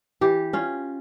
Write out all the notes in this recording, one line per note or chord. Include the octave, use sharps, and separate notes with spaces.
E3 G4
C#4 F4